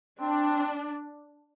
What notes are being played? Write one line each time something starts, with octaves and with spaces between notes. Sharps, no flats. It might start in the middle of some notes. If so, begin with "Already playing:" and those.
C4 D4